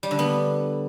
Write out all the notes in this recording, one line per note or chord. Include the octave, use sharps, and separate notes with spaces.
G3
D3
B3